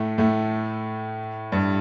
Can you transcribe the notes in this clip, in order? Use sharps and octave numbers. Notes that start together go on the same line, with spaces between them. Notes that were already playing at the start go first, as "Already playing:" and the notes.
Already playing: A2 A3
A2 A3
G2 G3